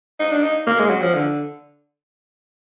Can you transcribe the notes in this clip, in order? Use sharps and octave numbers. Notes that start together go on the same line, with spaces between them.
D#4
D4
D#4
A#3
G#3
F#3
F3
D3